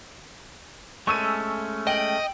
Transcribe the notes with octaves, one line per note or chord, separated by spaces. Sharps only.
G#3 A3 C#4 C#6 E6 D#7
D#5 G5 D7 F#7